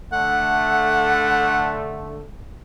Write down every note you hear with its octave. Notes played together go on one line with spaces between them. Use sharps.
D3 A3 F#5